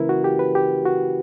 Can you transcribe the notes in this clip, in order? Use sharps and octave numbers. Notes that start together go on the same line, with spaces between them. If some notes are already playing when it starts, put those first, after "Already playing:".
Already playing: C#3 E3 A#3 C#4 E4 A#4 B4
F#4
G4
B4
G4
F#4